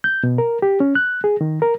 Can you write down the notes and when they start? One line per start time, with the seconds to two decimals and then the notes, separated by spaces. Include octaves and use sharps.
0.04 G6
0.23 B2
0.38 A#4
0.62 G4
0.80 C#4
0.95 F#6
1.24 G#4
1.41 D#3
1.62 A#4